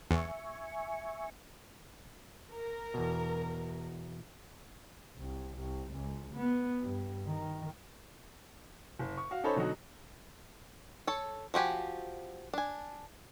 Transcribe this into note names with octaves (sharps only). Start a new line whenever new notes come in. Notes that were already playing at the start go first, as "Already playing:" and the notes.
E2 E5 G#5 C#6
A#4
E2 B2
C2
C2
C#2
B3
G2
D#3
F#1
C#6
F#4 F5
C#4 D#4 A4 C5 C#5 B5
B2 D3 F#3 D#4 F#4
A4 C#5
F3 F#4 G4 G#5
D4 G#5